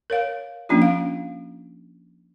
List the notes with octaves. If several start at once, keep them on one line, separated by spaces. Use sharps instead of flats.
A#4 C#5 F5
F3 A#3 C#4 D4 F4
F5